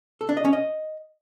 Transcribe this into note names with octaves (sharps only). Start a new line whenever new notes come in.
A4
D4
D#5
C#4
D#5